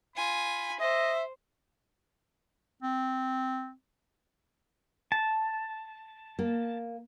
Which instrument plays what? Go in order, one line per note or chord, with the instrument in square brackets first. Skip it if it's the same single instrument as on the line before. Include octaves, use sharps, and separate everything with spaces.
[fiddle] F4 G#5 [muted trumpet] B5
[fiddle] C5 [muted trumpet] D#5 [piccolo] E5
[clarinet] C4
[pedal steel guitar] A5
[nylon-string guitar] A#3